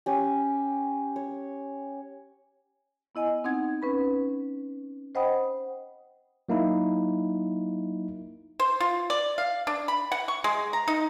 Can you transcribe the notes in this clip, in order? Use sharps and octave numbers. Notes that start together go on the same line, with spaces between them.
C#4 G4
C#5
B3 E4 D#5 G#5
C4 D#4 F#5 G#6
C#4 B4 B5
C5 D#5 F#5 G5 B5 D#6
F#3 A#3 D#4 E4
C5
F4
D5
F5
D4
B5
F#5
C#6
G#3
A#5
D#4